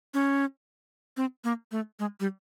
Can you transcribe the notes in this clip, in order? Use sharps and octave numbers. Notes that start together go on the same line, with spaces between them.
C#4
C4
A#3
A3
G#3
G3